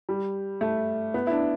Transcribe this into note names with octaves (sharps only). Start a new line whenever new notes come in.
G3
A3
B3
E4
D4